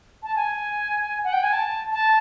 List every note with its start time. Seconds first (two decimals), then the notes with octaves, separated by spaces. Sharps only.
0.23 A5
0.36 G#5
1.24 F#5
1.33 G5
1.43 G#5
1.53 A5
1.92 A5